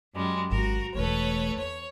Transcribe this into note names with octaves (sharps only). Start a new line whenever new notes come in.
F#2 G3 G#3
G#1 G#2 F#4 A#4
E1 A3 A4 B4 C#5
E2 C#5